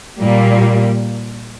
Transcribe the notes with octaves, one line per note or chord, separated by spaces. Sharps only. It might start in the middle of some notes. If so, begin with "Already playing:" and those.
A#2 G3 A#3